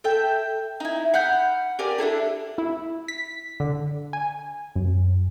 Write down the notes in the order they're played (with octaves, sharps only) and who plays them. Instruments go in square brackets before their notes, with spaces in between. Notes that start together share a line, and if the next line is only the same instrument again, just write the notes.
[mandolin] A4 E5 G5
D#4 E4
F#5 B5 F6 G6
G4 A#4 D5 G#5
D4 E4 G#4 A4
[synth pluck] E4
B6
D3
G#5
F#2